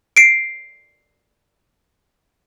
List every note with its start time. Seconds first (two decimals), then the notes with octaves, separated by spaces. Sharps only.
0.17 C7 D7